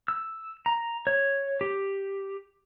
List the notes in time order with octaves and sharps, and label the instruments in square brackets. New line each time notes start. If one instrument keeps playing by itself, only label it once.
[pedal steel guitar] E6
A#5
C#5
G4